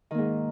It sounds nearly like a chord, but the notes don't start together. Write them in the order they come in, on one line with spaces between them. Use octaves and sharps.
D#3 A#3 G#2